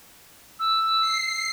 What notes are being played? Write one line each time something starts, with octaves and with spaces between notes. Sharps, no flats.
E6
C7